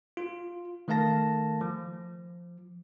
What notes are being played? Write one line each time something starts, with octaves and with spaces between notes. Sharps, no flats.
F4
D#3 A3 A#4 F5 A5 A#6
F3